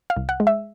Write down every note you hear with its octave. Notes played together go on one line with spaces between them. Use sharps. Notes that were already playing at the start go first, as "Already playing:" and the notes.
F5
C2
F#5
G#3
E5